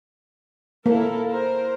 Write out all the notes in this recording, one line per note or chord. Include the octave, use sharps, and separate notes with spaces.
A#3 E4 A4 A#4
A#4 C5